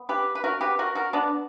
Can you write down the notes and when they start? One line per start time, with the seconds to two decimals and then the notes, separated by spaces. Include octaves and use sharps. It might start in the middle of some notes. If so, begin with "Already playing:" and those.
Already playing: B3
0.09 G4 B4
0.35 B4
0.44 F#4 A#4
0.61 G4 B4
0.79 F#4 A#4
0.95 F#4 A#4
1.13 B3 D4